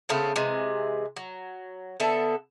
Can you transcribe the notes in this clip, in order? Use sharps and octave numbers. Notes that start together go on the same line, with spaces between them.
C#3 A3 B3 C4
C3 E3 G#3
F#3
D3 B3 A4 E5